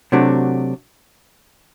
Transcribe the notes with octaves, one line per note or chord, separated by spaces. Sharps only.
C3 F#3 A3 D4 F#4